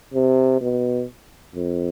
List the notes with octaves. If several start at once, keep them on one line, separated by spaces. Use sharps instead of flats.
C3
B2
F2